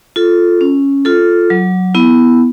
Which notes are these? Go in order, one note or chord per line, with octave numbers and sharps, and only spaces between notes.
F4 A4
C#4
F4 A4
F#3
B3 E4